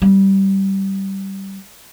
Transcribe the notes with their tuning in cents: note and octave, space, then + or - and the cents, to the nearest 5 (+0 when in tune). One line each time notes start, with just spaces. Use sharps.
G3 -15